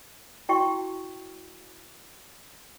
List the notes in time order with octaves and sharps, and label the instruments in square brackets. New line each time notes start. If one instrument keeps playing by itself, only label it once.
[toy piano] E4 F#4 G5 C#6